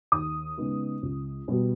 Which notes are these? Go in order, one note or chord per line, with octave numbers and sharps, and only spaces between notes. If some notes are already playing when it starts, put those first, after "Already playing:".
D#2 D#6
C#3 G#3 B3 D#4
C#2
B2 G3 B3